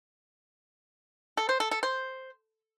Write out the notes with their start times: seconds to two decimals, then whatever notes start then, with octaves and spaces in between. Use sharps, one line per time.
1.37 A4
1.49 C5
1.60 A4
1.71 A4
1.83 C5